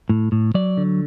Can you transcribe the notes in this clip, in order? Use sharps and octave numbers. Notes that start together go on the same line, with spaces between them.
A2
A2
F#3 D5
D3